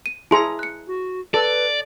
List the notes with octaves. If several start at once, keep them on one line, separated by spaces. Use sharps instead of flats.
D#7
E4 G#4 A5 A#5 C6 C#7
F#6 C#7
F#4
A4 B4 D5